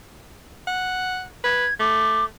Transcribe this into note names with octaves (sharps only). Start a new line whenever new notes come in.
F#5
B4 G#6
A3 D6